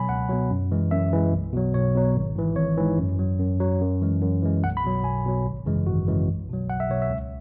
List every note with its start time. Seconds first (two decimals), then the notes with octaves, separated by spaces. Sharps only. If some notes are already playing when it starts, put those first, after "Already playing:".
Already playing: B2 F#3 G#5 B5
0.09 C#2 F#5
0.29 B2 F#3
0.50 F#2
0.71 E3 G#3
0.91 F#2 E5
1.13 E3 G#3
1.33 B1
1.53 B2 F#3
1.74 B1 C#5
1.95 B2 F#3
2.16 G#1
2.35 G#2 E3
2.56 G#1 C#5
2.77 G#2 E3
2.98 F#2
3.19 F#3
3.39 F#2
3.60 F#3
3.81 F#2
4.02 E3 G#3
4.22 F#2
4.42 E3 G#3
4.63 B1 F#5
4.77 B5
4.84 B2 F#3
5.04 B1 G#5
5.26 B2 F#3
5.46 G#1
5.66 F#2 C#3 E3 G#3
5.86 G#1 F#4
6.07 F#2 C#3 E3 G#3
6.28 B1
6.49 B2 F#3
6.69 B1 F#5
6.80 E5
6.90 B2 F#3 C#5
7.02 E5
7.10 C#2